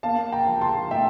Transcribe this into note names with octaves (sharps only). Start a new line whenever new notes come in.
A#3 F5 A5
G5 A#5
F3
A5 C6
A2 E5 G5